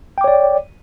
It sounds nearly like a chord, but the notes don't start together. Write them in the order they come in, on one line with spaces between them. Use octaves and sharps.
G5 D6 C#5 D5